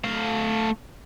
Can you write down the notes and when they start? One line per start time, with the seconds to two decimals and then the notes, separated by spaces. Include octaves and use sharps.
0.04 A3 F5